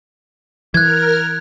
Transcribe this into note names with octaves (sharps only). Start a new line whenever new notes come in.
E3 A#4 F6 F#6 G#6